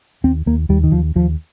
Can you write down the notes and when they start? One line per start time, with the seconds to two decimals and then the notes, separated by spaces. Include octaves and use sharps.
0.24 D#2 C4
0.46 D#2 A#3
0.69 D#2 G3
0.84 D#3
0.92 D#2 F3
1.15 D#2 F3